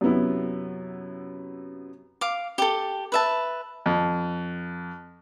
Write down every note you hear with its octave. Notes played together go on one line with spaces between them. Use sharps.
F#2 C3 B3 E4
F5 D6
G4 A4
B4 E5 A5
F2